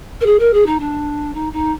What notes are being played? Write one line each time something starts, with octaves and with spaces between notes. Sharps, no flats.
A#4
G#4
A#4
G#4
D#4
D4
D#4
D#4